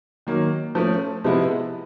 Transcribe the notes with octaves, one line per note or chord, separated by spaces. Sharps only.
D#3 F#3 A#3
F3 A3 C#4
C3 F3 G#3 B3 E4